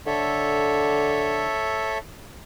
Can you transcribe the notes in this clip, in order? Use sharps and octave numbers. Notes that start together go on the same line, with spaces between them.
D3 A4 C#5 E5